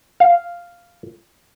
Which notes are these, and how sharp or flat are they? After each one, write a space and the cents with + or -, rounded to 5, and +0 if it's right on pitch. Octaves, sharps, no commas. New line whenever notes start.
F5 -5